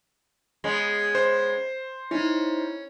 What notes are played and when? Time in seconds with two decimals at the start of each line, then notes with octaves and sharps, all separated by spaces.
0.64 G#3 B3 C#4
1.15 C5
2.11 C#4 D#4 E4